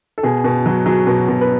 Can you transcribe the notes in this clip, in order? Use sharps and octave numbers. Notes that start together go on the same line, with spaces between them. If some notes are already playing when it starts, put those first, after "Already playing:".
A4
B2 G#4
B2
F#3
F#3 G#4
B2
B2
B4